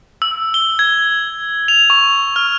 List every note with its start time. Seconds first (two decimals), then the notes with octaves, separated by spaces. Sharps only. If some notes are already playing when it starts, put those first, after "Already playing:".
0.22 E6
0.54 G7
0.79 G#6
1.68 F7
1.90 C#6
2.36 F6